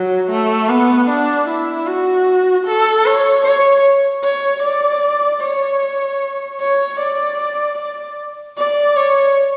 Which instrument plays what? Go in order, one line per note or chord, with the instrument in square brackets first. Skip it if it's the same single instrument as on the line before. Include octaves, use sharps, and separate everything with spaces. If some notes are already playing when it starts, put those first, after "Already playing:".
Already playing: [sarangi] F#3
A3
B3
D4
E4
F#4
A4
C#5
C#5
C#5
D5
C#5
C#5
D5
D5
C#5